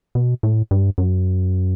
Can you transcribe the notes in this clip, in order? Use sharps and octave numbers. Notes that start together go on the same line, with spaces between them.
B2
A2
G2
F#2